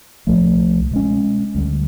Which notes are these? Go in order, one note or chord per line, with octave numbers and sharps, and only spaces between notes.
C2 A#2 F3 A3
B2 G#3 C#4
D2 D3 G3